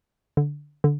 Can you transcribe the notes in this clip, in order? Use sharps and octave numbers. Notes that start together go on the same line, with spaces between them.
D3
D3